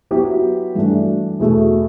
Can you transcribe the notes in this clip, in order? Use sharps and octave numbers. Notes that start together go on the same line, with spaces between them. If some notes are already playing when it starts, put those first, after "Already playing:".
F#3 B3 E4 G4
G2 E3 A3 D4 F#4
E2 B2 A3